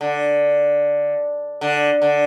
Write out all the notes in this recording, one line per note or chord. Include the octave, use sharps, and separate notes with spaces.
D3
D3
D3